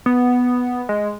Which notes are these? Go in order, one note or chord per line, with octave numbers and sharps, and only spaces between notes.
B3
G#3